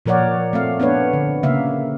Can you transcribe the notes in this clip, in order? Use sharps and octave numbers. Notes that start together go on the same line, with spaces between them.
A#2 F3 A#4 C#5 D5 F#5
A3 C4 F5
B3 D4 B4 C#5
D3
C#3 A#3 E5 F5